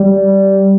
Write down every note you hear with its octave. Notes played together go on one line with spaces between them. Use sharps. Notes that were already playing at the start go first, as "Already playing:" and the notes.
Already playing: G3